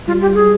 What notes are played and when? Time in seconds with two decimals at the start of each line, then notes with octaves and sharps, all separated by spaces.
0.07 G3 F4
0.22 G4
0.34 G#4